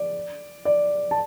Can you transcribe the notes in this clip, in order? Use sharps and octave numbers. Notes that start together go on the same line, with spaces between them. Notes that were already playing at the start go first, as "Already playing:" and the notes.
Already playing: D5
D5
A5